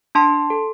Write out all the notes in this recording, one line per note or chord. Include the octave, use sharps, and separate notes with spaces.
D4 A5 C6
A4